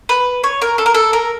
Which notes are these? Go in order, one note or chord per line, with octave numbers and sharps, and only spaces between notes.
B4
C#5
A#4
A4
A#4
A4
A#4